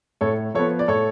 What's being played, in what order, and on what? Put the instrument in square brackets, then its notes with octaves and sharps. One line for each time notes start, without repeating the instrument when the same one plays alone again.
[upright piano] A2 A4 C#5
F3 B3 A4 C#5
D5
A2 A4 C#5